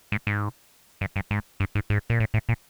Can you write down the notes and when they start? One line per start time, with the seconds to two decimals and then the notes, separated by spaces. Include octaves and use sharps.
0.12 G#2
0.27 G#2
1.01 G2
1.16 G2
1.31 G#2
1.60 G2
1.75 G#2
1.90 G#2
2.10 A#2
2.20 A2
2.34 A2
2.49 A#2